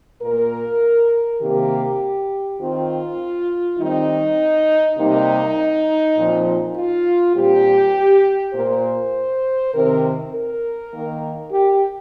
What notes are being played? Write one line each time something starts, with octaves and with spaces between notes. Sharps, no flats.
A#2 A#3 A#4
C3 D#3 A#3 G4
D#3 C4 F4
D#3 G3 C4 D#4
C3 G3 A#3 D#4
A#2 F3 C4
F4
A#2 G3 C4 G4
A#2 A#3 C5
C3 D#3 C4 A#4
A#4
D#3 A#3
G4